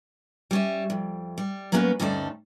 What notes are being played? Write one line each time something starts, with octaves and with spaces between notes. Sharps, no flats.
G3 C#4 E5
F2
G3
F#3 A#3 B3 C#4 G4 B4
D2 G2 C#4 D#4 A4 D5